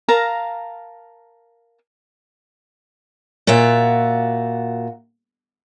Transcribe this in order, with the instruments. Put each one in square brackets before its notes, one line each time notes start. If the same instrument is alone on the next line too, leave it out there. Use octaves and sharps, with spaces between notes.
[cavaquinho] A#4 F5 A5 A#5
[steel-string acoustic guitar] A#2 F4 F#4 E5